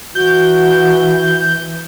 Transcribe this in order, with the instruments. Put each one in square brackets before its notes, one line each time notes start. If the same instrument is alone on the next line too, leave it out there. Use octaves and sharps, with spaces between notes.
[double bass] E3 [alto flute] F#4 [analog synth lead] G6